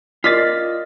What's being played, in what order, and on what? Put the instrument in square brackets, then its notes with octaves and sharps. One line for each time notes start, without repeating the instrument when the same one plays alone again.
[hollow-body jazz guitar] F4 D5 [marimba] A#4 D#5 [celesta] D#6 F6 [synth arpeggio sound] A6 B6